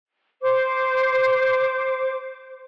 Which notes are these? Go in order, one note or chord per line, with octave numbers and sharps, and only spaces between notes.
C5 D6